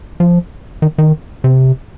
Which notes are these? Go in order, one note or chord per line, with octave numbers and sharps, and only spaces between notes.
F3
D#3
D#3
C3